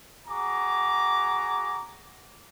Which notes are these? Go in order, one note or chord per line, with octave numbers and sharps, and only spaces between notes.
F#4 G#4 A#5 D6